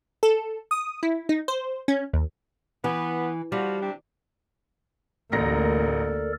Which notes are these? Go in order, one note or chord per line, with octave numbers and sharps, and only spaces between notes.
A4
D#6
E4
D#4
C5
C#4
D#2
E3 B3
F3 G3 F#4
C3 D4
A1 D2 A#3 A4 A#4 D5 A#5 A#6